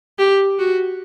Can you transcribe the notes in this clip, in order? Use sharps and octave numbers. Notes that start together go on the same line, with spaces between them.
G4
F#4